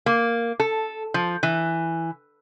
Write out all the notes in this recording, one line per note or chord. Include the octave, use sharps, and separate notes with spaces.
A#3
A4
F3
E3